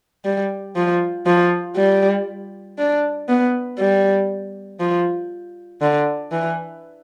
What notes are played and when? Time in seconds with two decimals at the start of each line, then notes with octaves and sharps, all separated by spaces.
0.25 G3
0.76 F3
1.27 F3
1.76 G3
2.78 D4
3.28 B3
3.79 G3
4.80 F3
5.81 D3
6.32 E3